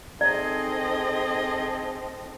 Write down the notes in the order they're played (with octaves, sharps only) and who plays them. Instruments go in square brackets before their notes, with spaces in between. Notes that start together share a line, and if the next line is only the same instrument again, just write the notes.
[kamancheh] C4 A4 [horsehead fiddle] D#4 D#5 [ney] G#4 [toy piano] D5